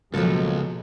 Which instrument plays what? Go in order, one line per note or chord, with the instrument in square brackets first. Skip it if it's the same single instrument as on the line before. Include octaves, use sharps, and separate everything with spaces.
[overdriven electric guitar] C#2 [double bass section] B2 F#3 G#3 [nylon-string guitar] F3 A#3 A4